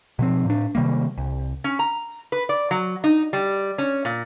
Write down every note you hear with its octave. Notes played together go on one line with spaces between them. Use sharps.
B2 F3 C4
A2 D4
C3 D#3 G3 A#3
C2
C#4
A#5
B4
D5
F#3
D#4
G3
C#4
A#2